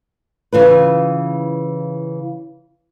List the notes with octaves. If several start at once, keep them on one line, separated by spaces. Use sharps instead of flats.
C#3 E3 F4 B4